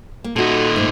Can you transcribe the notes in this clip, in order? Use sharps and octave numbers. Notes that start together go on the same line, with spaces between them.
A#3
A#2 D#4 F#4 A4
G#2 A3